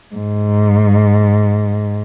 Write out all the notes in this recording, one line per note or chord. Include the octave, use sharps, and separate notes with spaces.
G#2